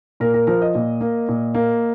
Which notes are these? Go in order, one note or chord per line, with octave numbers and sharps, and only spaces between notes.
A#2 A#4
A#4
F3 A#4
D#5
A#2
A#3
A#2
A#3